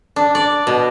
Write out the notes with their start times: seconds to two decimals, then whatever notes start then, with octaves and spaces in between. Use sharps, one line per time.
0.16 D4
0.35 D5
0.67 B2